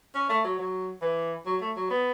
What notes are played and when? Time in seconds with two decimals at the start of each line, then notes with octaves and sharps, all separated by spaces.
0.15 C#4
0.29 A3
0.44 F#3
0.59 F#3
1.02 E3
1.46 F#3
1.61 A3
1.76 F#3
1.91 B3